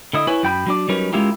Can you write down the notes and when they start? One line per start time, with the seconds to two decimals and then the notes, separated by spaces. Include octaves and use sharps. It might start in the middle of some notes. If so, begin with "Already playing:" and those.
0.13 D3 E4 D#5
0.27 E4 B4 C#5 G#5
0.43 F#2 G5 B5
0.66 F#3 D4 D5
0.89 F#3 G3 C#4 D#4 A#4 B4
1.12 G#3 C#4 E4 F4 G4 A#4